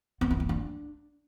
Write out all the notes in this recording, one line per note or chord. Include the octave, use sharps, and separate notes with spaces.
B3
E4
A#3
D4